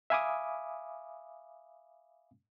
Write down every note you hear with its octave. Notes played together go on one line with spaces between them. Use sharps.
E5 F5 G#5 B5 D6 D#6